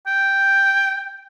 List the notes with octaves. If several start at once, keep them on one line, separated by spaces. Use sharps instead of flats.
G5